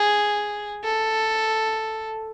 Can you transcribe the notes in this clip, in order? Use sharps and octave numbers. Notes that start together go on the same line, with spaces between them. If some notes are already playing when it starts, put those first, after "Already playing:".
Already playing: G#4
A4